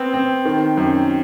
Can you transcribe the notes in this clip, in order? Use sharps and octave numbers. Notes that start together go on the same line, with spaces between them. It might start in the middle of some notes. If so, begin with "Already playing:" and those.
Already playing: B3 C4
C4
D#3
F#2